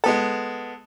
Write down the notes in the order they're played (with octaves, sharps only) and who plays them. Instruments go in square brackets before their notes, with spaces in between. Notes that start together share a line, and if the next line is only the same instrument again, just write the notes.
[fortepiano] G#3 B3 A4